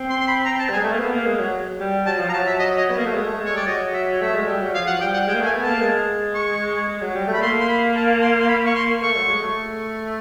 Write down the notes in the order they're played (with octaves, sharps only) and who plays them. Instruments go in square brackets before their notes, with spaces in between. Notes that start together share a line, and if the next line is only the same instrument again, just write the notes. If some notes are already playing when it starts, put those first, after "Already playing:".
Already playing: [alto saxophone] C4
[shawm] C6
C6
B5
A#5
A5
[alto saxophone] G3
[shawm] G#5
[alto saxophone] G#3
A3
A#3
B3
A#3
G#3
F#3
G3
[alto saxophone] F#3 [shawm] A5
[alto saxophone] F3
[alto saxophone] F#3 [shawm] A5 A#5
[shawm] E5
D#5
D#5
[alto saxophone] B3
A#3
A3
G#3
A3
G#3
[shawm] C#5
[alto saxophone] G3 [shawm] D5
[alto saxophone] F#3 [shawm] D#5
[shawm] E5
[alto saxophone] A3 [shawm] E5
[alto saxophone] G#3
G3
F#3
[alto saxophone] F3 [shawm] F5
[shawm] F#5
[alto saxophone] G3 [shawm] G5
[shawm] F#5
[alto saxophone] G#3 [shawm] G5
[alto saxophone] A#3
[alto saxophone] A3 [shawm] G#5
[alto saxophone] B3
[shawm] A5
[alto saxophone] A#3
G#3
[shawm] C#6
[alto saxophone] G#3
F#3
G3
A3
[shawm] B5
[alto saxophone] A#3 [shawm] C6
[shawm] C6
B5
A5
C6
C6
B5
C#6
C6
[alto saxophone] A3 [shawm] C#6
[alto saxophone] F#3
G#3
A3